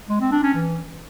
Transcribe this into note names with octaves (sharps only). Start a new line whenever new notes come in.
G#3
C4
D4
C#4
E3